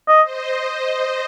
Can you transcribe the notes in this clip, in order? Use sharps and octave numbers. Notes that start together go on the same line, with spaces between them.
D#5
C5 D#5